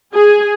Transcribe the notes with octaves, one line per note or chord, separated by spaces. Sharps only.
G#4